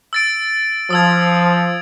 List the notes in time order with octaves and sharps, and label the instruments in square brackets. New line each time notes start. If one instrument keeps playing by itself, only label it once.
[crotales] E6 A6 D7
[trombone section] F3 [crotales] D#6 E6 G#6